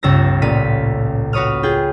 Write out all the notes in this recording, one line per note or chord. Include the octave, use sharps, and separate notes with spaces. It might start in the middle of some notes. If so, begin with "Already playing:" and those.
G1 C#2 E6 A#6
A1 A#2 F5 B6 D#7
F#4 B4 C#5 D#6 F6
F4 G#4 G5